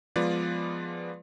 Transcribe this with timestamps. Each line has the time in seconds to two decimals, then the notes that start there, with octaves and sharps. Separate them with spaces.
0.16 F3 G#3 B3 F4 B4 D5